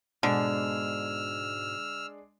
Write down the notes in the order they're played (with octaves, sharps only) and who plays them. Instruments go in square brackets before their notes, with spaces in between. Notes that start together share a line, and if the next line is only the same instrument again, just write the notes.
[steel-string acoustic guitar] G#2 B2 [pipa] D3 [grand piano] G#3 D4 G#4 [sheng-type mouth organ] E6 F6